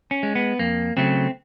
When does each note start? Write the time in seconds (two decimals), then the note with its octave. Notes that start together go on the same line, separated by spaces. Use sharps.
0.11 C#4
0.23 G#3
0.35 B3
0.59 F2 A#3
0.97 C#3 F#3 A3 C4